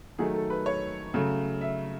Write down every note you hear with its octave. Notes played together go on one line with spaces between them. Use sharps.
D#3 F#3 A3 G#4
A4
B4
C#5
C#3 F#3 A3
E5